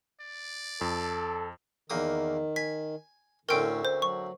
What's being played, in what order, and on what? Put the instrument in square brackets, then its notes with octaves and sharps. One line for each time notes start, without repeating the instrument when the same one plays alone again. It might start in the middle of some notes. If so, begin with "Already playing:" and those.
[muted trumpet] D5
[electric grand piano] F2 [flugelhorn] A4
[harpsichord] E2 A#3 D#6 [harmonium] D#3
[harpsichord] G#5 [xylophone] B6
[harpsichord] D2 C4 C#4 [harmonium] A2 [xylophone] A#4 G5
[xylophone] C5
[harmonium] F#3 [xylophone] C#6